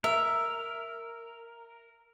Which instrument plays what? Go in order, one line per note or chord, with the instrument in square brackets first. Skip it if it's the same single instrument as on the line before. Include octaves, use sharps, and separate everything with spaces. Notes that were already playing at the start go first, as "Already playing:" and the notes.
[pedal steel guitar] A#4 [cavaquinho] E5